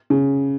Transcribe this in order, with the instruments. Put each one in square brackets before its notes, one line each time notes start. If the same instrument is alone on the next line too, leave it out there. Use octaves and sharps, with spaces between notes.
[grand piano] C#3